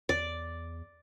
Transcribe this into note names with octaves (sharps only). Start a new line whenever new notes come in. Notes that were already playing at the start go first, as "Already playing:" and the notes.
E2 D5